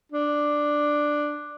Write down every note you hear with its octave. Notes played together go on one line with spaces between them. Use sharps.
D4